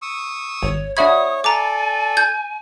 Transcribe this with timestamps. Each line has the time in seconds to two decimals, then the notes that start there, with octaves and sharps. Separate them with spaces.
0.02 C#6 D#6 E6
0.63 G#1 C#5
0.97 D4 F#4 C#5 E5 B5 D#6 G#6
1.44 A4 D5 G#5 A#5 D6
2.17 G6 G#6